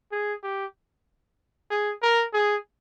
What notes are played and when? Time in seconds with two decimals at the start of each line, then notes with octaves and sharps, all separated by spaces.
0.12 G#4
0.43 G4
1.71 G#4
2.02 A#4
2.34 G#4